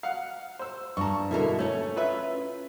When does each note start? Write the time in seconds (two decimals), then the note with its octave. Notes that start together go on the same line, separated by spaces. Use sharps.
0.03 F5 F#5
0.59 C5 E6
0.97 G2 A5 A#5 C#6
1.31 B2 D3 E4 A4 A#4
1.59 A3 C#4 C#5
1.96 F4 B4 E5